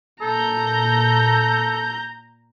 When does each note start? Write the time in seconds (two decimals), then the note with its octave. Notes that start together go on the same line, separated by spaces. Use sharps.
0.21 A#2 A4 A#5 G6